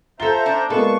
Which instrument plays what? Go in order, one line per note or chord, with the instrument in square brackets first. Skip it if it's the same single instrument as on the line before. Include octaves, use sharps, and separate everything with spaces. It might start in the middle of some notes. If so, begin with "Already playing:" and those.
[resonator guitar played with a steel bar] F4 A4 [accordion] C5 E5 A#5 [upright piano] G7
[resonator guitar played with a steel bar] D4
[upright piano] G#3 A#3 B3 [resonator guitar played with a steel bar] F4 A4 B4 [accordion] C#6